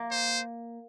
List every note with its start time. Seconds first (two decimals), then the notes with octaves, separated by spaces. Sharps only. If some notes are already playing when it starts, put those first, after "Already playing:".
Already playing: A#3
0.11 C5